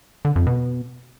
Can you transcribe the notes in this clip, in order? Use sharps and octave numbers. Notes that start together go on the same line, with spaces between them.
D3
F2
B2